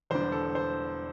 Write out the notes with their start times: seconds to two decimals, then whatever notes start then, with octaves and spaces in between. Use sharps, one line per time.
0.10 E1 E2 D3 G3 D4 C5
0.32 A4
0.55 C5